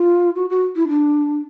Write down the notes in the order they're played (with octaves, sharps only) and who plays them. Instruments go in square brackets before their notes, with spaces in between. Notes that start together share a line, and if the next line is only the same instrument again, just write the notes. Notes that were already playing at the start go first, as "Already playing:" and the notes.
Already playing: [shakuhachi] F4
F#4
F#4
E4
D4